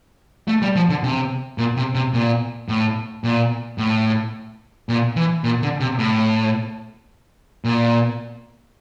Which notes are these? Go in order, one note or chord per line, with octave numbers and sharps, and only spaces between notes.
A3
G3
F3
D3
C3
A#2
C3
C3
A#2
A2
A#2
A2
A#2
E3
A#2
D3
C3
A2
A#2